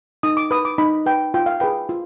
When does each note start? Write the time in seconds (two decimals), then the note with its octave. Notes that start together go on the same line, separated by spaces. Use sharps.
0.23 D#4 D#6
0.37 D6
0.51 B4 D#6
0.65 D6
0.78 D#4 B5
1.06 B4 G5
1.34 F4 G5
1.46 F5
1.60 G#4 B4 G5
1.89 F4